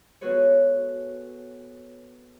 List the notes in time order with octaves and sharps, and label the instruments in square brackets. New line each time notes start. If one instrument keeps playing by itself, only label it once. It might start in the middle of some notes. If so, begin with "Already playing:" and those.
[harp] B3 F#4 G#4 A4 B4 C#5